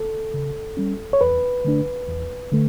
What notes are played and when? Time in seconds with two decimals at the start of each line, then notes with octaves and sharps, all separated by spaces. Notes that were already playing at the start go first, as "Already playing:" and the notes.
Already playing: A4
0.34 C#3
0.77 G3 C#4
1.13 C#5
1.21 E2 B4
1.65 D3 A3 D4
2.08 E2
2.51 D3 A3